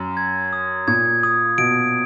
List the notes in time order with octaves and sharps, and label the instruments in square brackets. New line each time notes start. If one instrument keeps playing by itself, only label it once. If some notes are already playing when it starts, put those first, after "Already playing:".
Already playing: [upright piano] F#2
[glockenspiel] G#6
D#6
[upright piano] A#2 [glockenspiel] G#6
[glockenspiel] D#6
[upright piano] B2 [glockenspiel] D7